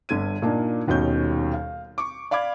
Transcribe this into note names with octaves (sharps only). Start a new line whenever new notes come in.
G1 G2 D3 G#6 D#7
A#2 A#3 D4 D#4
D#1 D#2 B2 C#4 G6
F5
C#6 D6
D5 F5 B5 D6 G#6